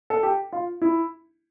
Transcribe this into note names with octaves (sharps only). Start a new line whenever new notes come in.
A4
G4
F4
E4